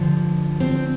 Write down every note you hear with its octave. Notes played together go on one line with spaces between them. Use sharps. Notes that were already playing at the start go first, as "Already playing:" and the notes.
Already playing: G2 D3 F3
C4